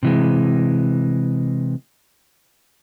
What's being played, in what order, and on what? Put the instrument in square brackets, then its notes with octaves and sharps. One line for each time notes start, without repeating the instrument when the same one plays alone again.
[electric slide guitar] C3 E3 G#3